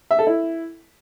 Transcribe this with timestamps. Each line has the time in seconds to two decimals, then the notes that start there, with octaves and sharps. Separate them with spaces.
0.11 E5
0.19 A4
0.27 E4